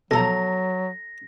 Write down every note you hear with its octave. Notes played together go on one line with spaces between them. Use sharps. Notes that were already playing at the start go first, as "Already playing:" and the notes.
B2 F3 F#3 A4 A#5 A#6